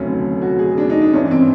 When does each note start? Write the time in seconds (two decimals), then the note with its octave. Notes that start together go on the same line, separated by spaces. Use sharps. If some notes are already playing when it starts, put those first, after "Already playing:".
Already playing: F1 D#2 D3 F#3 A3 C#4
0.42 F#4
0.59 G#4
0.78 D4
0.90 D#4
1.01 D4
1.13 G#1 G2 E3 C#4
1.31 C4